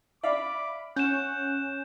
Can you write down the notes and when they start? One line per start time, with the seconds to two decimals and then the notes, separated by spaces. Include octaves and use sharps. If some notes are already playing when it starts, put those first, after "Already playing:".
0.23 D5 E5 F5 B5 D6
0.96 C#4 F#5 G6 E7